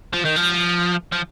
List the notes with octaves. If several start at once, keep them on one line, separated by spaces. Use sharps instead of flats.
F3
D#3
F3
F3